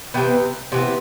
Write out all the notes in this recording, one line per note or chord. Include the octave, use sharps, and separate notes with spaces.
C3 E3 B3 G5
C3 E3 B3